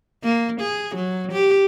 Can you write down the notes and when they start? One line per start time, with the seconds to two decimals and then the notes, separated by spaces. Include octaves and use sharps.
0.23 A#3
0.61 G#4
0.95 F#3
1.32 G4